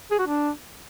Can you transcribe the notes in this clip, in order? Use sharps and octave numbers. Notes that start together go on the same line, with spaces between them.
G#4
F#4
D4